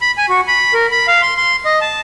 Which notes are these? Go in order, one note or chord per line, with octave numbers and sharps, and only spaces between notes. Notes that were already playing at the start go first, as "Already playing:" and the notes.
B5
G#5
F#4
B5
A#4
B5
F5
C6
C6
D#5
A5